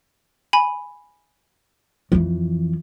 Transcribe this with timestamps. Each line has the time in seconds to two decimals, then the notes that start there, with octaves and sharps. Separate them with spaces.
0.53 G#5 B5
2.12 F2 E3